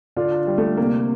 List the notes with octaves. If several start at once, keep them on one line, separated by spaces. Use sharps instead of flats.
D3 D4 F4
G3
A3
C3 A#3